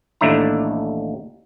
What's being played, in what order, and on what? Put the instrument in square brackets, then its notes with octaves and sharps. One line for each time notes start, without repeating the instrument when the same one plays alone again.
[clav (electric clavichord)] A1 D#2 A3 D4 E4 A#5